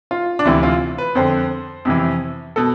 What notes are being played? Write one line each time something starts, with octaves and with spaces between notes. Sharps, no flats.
F4
D4
D2 C3 E3 E4
F4
B4
F2 D3 C5
F2 C3 E3
B2 A4